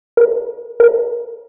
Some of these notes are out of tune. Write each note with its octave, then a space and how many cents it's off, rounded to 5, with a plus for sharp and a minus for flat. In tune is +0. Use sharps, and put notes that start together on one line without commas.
A#4 +45
A#4 +40